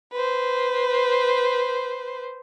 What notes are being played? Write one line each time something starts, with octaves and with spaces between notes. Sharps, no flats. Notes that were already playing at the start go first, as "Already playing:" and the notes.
B4 C5